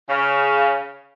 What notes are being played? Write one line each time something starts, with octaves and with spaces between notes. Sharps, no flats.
C#3